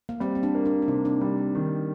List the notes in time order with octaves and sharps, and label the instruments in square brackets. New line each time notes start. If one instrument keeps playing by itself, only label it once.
[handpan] A#3
[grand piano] G3 [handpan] C4
[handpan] C4
D4
[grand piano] A#3
[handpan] D4
D4
[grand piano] C3 [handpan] D#4
[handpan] D4
[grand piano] G3 [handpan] D4
[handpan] C4
[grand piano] D#3 [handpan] A#3